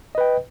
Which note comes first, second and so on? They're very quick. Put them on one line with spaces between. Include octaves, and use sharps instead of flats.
D#5 B4 G5